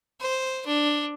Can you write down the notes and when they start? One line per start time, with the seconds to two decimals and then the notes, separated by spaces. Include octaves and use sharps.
0.20 C5
0.66 D4